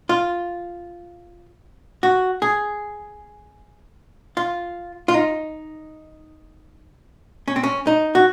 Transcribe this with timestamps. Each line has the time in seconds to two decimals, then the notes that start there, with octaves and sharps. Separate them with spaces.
0.09 F4
2.03 F#4
2.42 G#4
4.37 F4
5.08 F4
5.14 D#4
7.48 C#4
7.56 C4
7.63 C#4
7.87 D#4
8.15 F#4